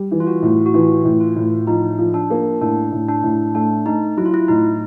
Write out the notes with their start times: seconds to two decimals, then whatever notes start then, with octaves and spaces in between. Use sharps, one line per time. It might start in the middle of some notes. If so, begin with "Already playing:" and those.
Already playing: G3
0.11 E3
0.20 F4
0.27 F#4
0.43 A2
0.66 F#4
0.74 E3 F4
1.05 A2
1.20 F4
1.36 A2
1.67 F3 D#4
1.99 F3
2.14 D4
2.30 A#3
2.61 A2 D4
2.92 A2
3.08 D4
3.24 A2
3.55 A3 D4
3.86 A3 D#4
4.17 F#3 E4
4.25 F4
4.34 E4
4.48 A2 D#4